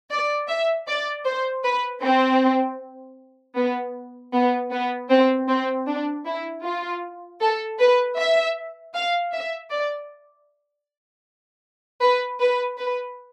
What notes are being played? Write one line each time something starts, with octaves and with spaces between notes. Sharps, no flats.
D5
E5
D5
C5
B4
C4
B3
B3
B3
C4
C4
D4
E4
F4
A4
B4
E5
F5
E5
D5
B4
B4
B4